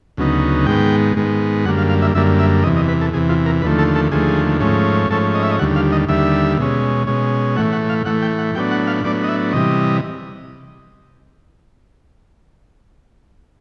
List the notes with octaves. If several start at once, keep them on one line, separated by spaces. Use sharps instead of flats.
D2 C#3 F#3 B3 D#4
G#2 D#3 G#3 B3 G5
G#2 D#3 G#3 B3
F#2 D3 G3 A#3 F#5
F5
F5
E5
F#2 D3 G3 A#3 E5
E5
E2 C3 E3 D#5
D#5
B4
A4
E2 C3 E3 G#4
F4
A#4
D#2 D3 F3 A3 B4
A4
A4
D#2 D3 F3 A3 G#4
G#2 F3 A3 C#4
G#2 F3 A3 C#4 A4
D#5
E5
D#5
D#2 D3 G3 F#5
F5
D#5
D#2 D3 G3 E5
B2 G#3 C#4
B2 G#3 C#4
A2 E3 A3 F#5
F#5
F5
A2 E3 A3 F#5
G5
F#5
A2 F#3 B3 D4 G5
F#5
F5
A2 F#3 B3 D4 D5
D#5
E5
C3 E3 G3 D#5